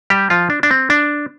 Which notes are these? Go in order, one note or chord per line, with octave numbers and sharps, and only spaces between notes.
G3 G4
F3 F4
D4
D4
C4
D4